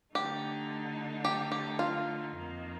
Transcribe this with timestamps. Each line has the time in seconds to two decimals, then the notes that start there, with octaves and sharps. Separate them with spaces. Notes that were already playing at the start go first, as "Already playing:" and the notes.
0.15 D3 A3 D#4 G4
1.25 G4
1.52 G4
1.79 F4
2.34 F2 D#3 A#3